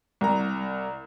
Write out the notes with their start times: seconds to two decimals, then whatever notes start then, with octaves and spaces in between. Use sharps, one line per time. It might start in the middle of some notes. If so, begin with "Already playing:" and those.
0.21 C2 A#5